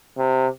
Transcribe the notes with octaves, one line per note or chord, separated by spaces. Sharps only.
C3